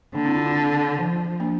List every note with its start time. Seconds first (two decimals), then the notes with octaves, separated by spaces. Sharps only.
0.15 D3 A#3 D4
0.25 C4 E4
0.35 D4 F4
0.46 D4 F4
0.98 F3
1.40 A#3 D4